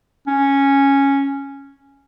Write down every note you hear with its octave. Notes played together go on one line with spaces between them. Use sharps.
C#4